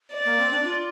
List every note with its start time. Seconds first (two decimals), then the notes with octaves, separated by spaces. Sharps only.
0.13 D5
0.25 A#3
0.38 C4
0.51 D4
0.64 F4